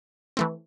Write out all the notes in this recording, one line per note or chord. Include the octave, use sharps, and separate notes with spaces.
E3 A3 C4